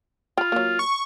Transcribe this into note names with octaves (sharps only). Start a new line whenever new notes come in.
F4 G5 B5
F#3 A#3
C#6